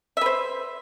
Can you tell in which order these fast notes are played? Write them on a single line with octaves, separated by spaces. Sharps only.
E5 B4 C5